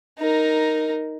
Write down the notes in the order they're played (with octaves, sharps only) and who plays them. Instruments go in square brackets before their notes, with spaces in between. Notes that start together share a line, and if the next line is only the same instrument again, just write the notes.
[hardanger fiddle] D#4 A#4